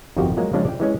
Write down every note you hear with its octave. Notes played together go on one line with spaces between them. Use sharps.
G1 F2 D#3 F3 F#4 G4
F3 F#3 G#3 A#3
C#3 F3 G3 G#3 C#4 D4
D5 G5
E3 G#3 C#4